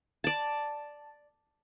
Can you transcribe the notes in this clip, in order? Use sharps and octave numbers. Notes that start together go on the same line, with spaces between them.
D5 A5